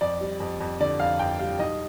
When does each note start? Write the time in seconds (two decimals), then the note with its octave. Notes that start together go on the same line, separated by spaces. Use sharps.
0.01 F2 D5
0.21 G3
0.40 F2
0.61 F2
0.80 D3 D5
1.00 F2 F5
1.19 F2 G5
1.39 G3 F5
1.59 B1 D#5